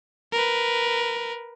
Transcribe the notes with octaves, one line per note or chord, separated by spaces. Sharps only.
A#4 B4